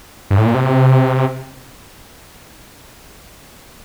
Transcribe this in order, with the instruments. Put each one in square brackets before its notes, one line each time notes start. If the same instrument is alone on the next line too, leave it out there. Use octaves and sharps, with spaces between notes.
[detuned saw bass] G2
A2
A#2
C3